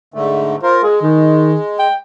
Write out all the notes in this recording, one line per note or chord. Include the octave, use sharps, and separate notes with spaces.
G#2 D3 A3
F4 A#4 C5
G#3 G#4
D#3
G5